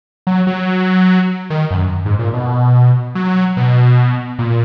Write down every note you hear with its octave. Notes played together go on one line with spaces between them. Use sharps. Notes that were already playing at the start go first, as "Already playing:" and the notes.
F#3
F#3
D#3
F#2
G#2
A#2
B2
F#3
B2
A#2